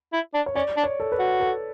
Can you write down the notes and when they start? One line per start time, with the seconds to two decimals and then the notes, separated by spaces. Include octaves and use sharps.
0.13 E4
0.34 D4
0.46 C#5
0.55 C#4 D5
0.77 D4
0.84 C#5
1.00 A4
1.12 B4
1.19 F#4
1.40 A4